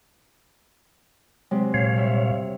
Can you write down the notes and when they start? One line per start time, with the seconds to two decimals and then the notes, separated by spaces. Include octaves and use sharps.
1.51 C3 F#3 G#3
1.74 A#2 C#5 F5
1.96 G2 C5 E5